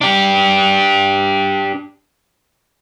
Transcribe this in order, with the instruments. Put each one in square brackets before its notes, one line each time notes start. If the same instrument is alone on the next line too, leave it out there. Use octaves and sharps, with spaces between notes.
[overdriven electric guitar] D4 G4